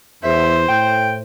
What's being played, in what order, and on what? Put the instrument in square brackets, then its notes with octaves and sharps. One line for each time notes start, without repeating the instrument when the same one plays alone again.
[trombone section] E2 [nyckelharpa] C5 [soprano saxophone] E5
[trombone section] A2 [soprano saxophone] G5